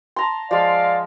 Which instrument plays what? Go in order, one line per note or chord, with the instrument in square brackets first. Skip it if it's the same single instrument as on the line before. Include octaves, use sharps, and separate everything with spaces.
[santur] A5 A#5 C6
[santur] F3 G#3 [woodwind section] D5 F5